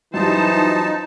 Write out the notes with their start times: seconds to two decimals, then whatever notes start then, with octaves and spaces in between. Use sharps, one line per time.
0.14 F#2 E3 G3 D#4 F4 C5 A5